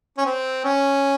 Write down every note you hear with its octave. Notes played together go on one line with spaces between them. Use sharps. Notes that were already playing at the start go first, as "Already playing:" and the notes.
C#4
C4
C#4